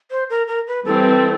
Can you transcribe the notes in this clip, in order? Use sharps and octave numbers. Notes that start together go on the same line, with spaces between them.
C5
A#4
A#4
B4
E3 G3 C4 A4